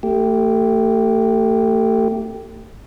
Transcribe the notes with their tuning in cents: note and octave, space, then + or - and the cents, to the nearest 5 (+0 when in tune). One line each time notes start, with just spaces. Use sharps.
A3 +30 G4 -5